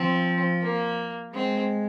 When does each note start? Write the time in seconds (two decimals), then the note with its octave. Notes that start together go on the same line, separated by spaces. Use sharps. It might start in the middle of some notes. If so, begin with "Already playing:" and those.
Already playing: F3 C4
0.61 A#3
1.34 G#3 C4